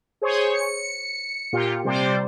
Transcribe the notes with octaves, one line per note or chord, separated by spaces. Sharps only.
G#4 C5 C#5
C#7
A#2 F4 G4
C3 G3 C5 D5